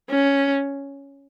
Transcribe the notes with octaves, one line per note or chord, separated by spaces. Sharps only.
C#4